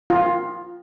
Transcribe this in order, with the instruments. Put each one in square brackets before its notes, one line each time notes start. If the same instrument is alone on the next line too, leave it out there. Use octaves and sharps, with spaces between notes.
[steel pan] F4